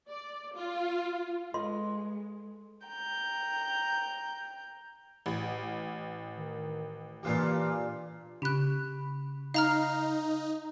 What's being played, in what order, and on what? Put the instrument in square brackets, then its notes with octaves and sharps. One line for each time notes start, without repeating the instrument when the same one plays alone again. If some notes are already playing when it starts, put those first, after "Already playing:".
[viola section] D5
F4
[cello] G#3 [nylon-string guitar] A4 B4 D#5 [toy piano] C6
[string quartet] G5 A#5 G6
[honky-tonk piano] A1
[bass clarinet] D#3
[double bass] A#2 [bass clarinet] E3 [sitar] D4 F4 G4
[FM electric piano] C#3 B5 [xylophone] G4 F#6
[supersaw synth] D#4 [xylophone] F5 A#5 F6